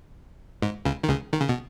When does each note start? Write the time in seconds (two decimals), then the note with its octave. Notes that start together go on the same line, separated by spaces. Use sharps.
0.62 G#2
0.85 C#2 C#3
1.03 D#3
1.08 C#2 C#3
1.33 D#3
1.41 C#3
1.49 B2